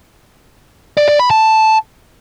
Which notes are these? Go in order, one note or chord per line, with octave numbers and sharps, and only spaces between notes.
D5
D5
B5
A5